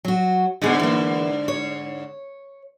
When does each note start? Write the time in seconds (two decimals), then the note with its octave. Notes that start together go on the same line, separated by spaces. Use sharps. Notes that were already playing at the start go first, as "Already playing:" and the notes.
0.05 F#3 F#4
0.62 G#2 D3 B3 G#4 D#5
0.79 E3 A#3
1.48 C#5